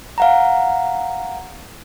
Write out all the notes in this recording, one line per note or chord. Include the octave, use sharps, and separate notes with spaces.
F5 F#5 A#5